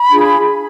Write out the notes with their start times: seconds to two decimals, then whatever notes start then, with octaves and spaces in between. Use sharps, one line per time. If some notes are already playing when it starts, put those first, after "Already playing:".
Already playing: B5
0.10 D4 F4 G#4